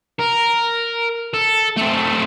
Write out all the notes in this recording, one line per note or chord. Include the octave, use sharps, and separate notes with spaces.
A#4
A4
A3 C4